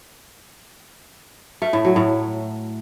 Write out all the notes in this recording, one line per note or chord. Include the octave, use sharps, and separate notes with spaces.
A3
A2
F#3
A2